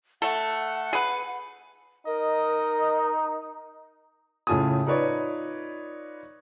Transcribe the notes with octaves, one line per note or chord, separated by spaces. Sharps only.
A3 A4 F#5
G#4 B4
D#4 A#4 D#5
A2 C#3 F4 G#5 A5 D#6
D#4 F4 B4 C#5 D5